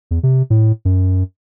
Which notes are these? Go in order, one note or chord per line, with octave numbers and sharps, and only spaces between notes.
E2
C3
A2
F#2